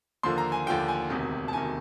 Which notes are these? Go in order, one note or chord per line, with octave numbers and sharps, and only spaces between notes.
D#2 D3 F3 A#3 C6
A#5
G#5
D#2 D3 F3 A#3 G5
G#5
E1 D2 C3 D#3
A5
E1 D2 C3 D#3 G#5